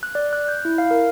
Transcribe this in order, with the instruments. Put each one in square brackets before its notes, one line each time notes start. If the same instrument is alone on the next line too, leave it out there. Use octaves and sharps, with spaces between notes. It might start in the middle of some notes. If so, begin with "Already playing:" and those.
[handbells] F#6
D5
F#6
G6
E4
F5
A#4